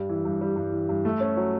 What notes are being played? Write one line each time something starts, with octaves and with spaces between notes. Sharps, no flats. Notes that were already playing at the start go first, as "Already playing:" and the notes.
Already playing: G2 G3
E3
G2
G3
G2
E3
G2
A3
C#4
F#3